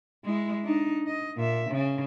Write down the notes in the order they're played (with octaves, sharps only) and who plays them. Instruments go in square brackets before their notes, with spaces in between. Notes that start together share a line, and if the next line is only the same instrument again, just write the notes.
[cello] G#3 E4
D4 D#4
D#5
A#2 E5
C#3